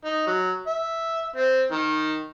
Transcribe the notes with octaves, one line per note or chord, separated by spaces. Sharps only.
D#4
F#3
E5
C4
D#3